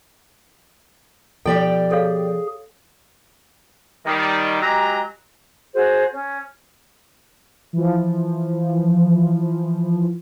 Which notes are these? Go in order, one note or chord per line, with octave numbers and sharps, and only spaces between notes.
B2 F3 G4 A4 D5 G5
G#4 A4 C#5 F5
D#3 G3
F#3 G#3 G4 A#5
F#4 G#4 C5
C#4
E3 F3